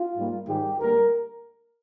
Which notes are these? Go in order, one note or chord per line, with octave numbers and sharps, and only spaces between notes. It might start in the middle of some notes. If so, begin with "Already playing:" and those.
Already playing: F4
G#2 G3 A#3
G#2 D#3 G3 G4
D2 D3 G3 A#3 A#4